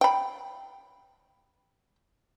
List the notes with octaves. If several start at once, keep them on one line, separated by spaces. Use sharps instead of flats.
G5 B5